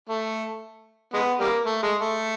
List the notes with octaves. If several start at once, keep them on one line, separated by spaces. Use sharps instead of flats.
A3
G#3 B3
G3 A#3
A3
G#3
A3